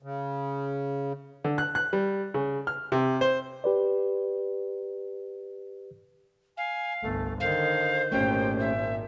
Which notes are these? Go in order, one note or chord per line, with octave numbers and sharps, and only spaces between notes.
C#3
D3
F#6
F#6
G3
C#3
F6
C3
C5
G4 B4 D5
F5 G#5
G1 C2 A3
D3 D#3 C5 F5
G#1 A#2 A3 C#4 G4 G5
E5